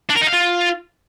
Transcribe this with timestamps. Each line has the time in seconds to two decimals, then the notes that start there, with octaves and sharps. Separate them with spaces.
0.09 D4
0.15 A#4
0.21 D#4
0.27 F5
0.33 F4